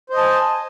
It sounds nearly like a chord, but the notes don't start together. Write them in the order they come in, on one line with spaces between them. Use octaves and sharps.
C5 D#5 A5 G#5